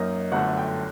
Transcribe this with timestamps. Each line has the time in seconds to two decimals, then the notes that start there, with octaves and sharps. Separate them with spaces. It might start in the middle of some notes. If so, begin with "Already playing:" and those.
Already playing: F#2 F#3 A#3 D#4 D#5
0.32 G1 F#2 D3 A3 F#5
0.57 G5